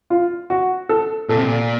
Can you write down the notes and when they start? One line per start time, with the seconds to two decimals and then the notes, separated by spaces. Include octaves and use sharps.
0.10 F4
0.50 F#4
0.89 A4
1.29 A#2 A4
1.36 C3
1.43 A#2